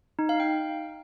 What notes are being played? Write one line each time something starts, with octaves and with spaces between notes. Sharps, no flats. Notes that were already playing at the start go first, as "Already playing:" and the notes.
D#4
F5
G5